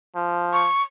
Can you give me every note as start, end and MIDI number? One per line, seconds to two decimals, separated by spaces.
0.16 0.67 53
0.53 0.82 85